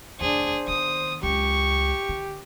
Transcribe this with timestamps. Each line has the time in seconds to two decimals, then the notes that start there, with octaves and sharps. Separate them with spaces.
0.20 F1 D#2 D4 G#4 C5
0.68 D#3 B3 D#6
1.23 C#2 F#2 G4 C#6
2.09 D3